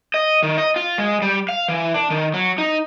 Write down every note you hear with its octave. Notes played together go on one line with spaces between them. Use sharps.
D#5
D#3
D#5
F4
G#3
G3
F5
E3
D4
D#3
F#3
D#4